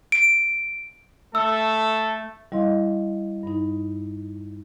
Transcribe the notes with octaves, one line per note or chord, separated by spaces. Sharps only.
D7
A3 A4 E6
G3 E4 D#5 F5 C6
G2 D#4